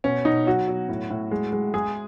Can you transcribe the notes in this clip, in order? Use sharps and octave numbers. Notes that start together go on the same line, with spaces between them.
B2 C#4
B2 D#4
F#3 F#4
F#3
A2
A2
G#3
G#3
G#3 G#4